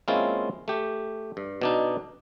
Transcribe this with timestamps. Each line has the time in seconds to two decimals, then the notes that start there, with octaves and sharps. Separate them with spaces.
0.08 G#3 A#3 C4 C#4 E4 F4
0.68 A3 G4
1.37 G2
1.62 B2 D4 D#4